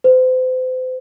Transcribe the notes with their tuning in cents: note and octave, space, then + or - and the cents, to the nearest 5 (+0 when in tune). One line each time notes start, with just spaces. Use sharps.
C5 -35